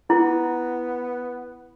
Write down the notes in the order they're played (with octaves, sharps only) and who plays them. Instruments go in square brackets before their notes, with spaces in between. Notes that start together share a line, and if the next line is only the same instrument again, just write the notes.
[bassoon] B3 [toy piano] E4